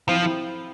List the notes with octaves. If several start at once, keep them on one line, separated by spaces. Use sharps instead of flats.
F3 C4 E4
C4 E4